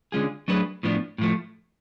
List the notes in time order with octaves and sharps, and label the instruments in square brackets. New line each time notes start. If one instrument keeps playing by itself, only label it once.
[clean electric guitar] D3 G#3 C#4 F4 G#4
F#3 A3 D4 G#4 B4
A2 F3 B3 D4
A2 F3 A3